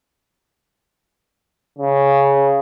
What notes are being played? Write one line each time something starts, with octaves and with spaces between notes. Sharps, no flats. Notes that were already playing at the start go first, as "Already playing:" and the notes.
C#3